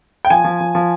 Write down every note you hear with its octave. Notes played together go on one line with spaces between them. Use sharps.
G5
F3 G#5
F3
F3
F3